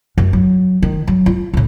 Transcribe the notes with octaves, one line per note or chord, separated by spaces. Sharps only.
F#2
F#3
D#3
F#3
F4
C#2 A2